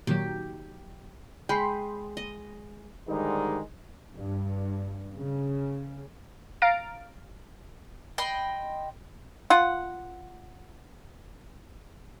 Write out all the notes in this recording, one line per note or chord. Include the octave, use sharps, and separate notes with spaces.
A#2 D#3 F#3 G4
G#3 G5 B5 C6
D#5
G#2 D3 D#3 G3 G#3 D#4
G2
C#3
F5 A#5 F6 A6 A#6 D7
D#5 G5 B5 C6
F4 F#5